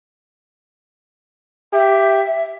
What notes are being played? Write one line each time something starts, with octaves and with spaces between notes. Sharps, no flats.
G4 E5